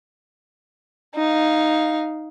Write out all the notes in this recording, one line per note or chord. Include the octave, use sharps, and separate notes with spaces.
D#4 F5